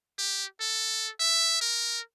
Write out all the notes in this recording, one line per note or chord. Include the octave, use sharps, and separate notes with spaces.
G4
A4
E5
A#4